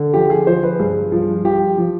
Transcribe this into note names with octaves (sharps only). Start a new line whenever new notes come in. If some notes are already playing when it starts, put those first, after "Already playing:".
Already playing: D3
F3 G4
G#4
F3 C5
B4
G2 G#4
F3
F3 G4
F3